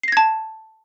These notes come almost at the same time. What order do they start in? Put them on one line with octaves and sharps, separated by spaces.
C7 A#6 G#6 A5